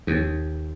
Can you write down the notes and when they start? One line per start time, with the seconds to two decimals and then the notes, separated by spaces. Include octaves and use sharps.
0.07 D#2